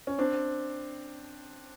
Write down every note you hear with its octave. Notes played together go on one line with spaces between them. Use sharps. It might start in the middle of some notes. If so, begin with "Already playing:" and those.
C#4
C4 D4